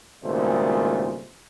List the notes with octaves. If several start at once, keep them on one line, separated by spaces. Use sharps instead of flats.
G#1 C#2 A#2 G3 A3 C5